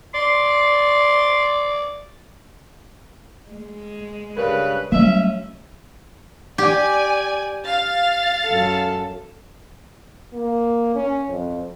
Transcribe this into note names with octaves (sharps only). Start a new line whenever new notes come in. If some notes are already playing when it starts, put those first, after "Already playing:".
D5 C6
G#3
G2 C#3 A#4 B4
F#3 G3 A3 C#4 D#5 E5
G4 D5 G#5
F5 A6
F#2 A4
A#3
C#4
F2